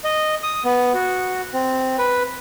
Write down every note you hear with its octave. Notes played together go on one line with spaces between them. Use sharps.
D#5
D#6
B3
F#4
C4
B4